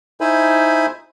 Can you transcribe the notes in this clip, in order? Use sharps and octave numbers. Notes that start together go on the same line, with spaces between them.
D#4 E4 C5 E5 G#5 B5